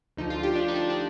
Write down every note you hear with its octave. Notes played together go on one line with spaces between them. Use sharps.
D2 D3 F3 D#4
F4
G4
D4
D#4
D4
D4